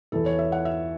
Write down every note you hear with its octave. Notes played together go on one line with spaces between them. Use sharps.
E2 E3 A4
C#5
E5
F#5
E5